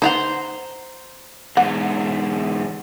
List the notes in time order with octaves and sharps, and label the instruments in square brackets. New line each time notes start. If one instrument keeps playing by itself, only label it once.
[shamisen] D#4 E5 F#5 [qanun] C5 A#5 C6
[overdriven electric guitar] E2 G#2 [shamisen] F#5